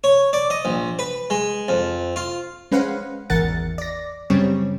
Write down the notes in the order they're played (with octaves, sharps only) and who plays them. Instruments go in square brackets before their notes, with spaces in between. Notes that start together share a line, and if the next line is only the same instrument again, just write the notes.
[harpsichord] C#5
D5
D#5
A#1
B4
G#3
F2
F4
[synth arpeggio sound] G#3 C#4 B4 C5 F5 F#5
G#1 E2 A#4 F#5 A6 C#7
D5 A#6
F#2 C#3 G3 C4 C#5